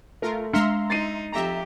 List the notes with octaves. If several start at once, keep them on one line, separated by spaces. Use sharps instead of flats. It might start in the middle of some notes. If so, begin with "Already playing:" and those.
A3 F4 A#4
G#3 D4 E5 F5 A#5 C6 F6 C#7
D#4 A6 C7 D#7
F2 G4 E5 A#5